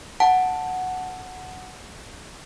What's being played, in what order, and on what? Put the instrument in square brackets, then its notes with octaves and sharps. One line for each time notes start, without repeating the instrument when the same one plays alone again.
[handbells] F#5 A5